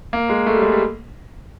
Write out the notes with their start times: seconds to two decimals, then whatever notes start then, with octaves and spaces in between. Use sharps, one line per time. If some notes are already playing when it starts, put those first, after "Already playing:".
0.13 A#3
0.29 G#3
0.46 A3
0.55 G3
0.62 G#3
0.72 G3